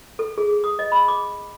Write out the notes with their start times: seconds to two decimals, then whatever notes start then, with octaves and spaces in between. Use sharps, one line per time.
0.19 A4
0.38 G#4
0.64 D#6
0.79 D#5
0.92 B5
1.08 D6